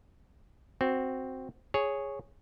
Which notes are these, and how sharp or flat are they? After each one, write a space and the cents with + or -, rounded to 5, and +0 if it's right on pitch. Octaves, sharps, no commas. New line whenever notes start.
C4 +0 F#4 +0
G#4 +0 C#5 +0